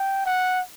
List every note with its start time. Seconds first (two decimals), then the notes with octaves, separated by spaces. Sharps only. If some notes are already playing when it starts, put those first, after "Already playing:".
Already playing: G5
0.26 F#5